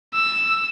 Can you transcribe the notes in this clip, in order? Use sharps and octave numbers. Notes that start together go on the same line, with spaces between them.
E6